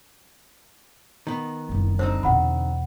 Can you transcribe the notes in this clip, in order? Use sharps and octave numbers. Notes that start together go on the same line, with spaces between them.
D#3 B3
F#1 C2
D3 C4 D#4 C5
E2 B2 E4 F#5 B5